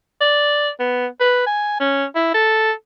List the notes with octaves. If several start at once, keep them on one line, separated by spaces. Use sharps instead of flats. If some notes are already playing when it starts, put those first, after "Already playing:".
D5
B3
B4
G#5
C#4
E4
A4